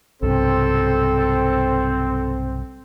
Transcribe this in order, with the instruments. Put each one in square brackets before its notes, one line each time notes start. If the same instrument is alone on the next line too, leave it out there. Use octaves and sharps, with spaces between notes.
[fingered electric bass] B1 G2 C3 [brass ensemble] C4 [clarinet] A4